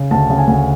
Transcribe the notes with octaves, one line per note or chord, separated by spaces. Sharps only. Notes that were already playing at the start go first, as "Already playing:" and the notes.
Already playing: C#3
D2 A5
C#3
G#5
D2